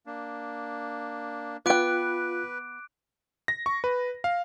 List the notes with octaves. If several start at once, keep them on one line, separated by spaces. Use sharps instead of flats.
A#3 D4
B3 F4 B4 G5 D6 F#6 D7
A#6
C#6
B4
F5